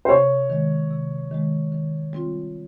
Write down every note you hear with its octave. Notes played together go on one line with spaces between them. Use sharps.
C5
C3 C#5
D#3 G#3
C3
D#3 G#3
D#3
G3 C4 F4